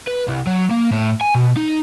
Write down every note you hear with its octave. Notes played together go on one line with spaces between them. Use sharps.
B4
C2
F#3
A#3
A2
G#5
B2
D#4